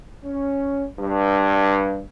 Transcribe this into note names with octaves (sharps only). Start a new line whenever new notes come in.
C#4
G2